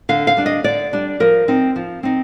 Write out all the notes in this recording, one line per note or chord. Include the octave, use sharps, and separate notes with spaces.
D3 F5
F5
G3 D4
D#5
D3 D5
G3 D4
F3 A#4
C4 D#4
F3
C4 D#4